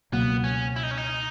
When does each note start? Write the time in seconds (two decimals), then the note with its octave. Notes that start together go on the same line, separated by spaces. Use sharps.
0.12 C#2 B2 F#3 A#3 B3
0.44 C#4
0.76 E4
0.83 D#4
0.91 C#4
0.97 D#4